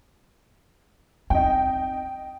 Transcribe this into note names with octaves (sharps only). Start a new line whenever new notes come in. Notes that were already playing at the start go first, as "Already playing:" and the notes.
C4 D#4 D#5 G5